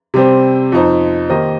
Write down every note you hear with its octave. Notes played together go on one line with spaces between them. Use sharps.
C3 G3 C4 G4 C5
F2 F3 D#4 C5
D#3 A#3 G4 C5 D#5